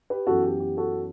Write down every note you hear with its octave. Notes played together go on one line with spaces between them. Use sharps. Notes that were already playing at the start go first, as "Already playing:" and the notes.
G4 B4
F#2 E3 B3 F#4 A4
G4
G4
F#4 A4